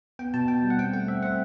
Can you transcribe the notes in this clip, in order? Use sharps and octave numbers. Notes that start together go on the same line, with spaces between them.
B3 G5
B2 A5
B2 G5
G3
F#5
C4 G5
A3 F#5
C4 E5
C4 F#5